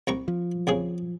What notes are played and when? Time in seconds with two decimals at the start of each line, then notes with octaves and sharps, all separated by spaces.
0.07 C2 A#5 C#6
0.28 F3
0.67 C2 C#3 G#4